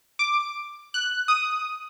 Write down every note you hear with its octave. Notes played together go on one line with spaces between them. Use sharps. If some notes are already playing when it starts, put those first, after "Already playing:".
D6
F#6
D#6